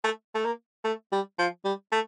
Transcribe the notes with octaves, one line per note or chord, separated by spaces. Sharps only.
A3
A3
A#3
A3
G3
F3
G3
A3